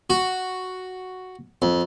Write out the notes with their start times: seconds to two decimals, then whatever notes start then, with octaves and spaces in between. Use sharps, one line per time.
0.10 F#4
1.62 F2